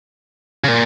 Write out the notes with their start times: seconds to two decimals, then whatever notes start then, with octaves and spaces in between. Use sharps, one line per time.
0.64 C#3
0.68 A#2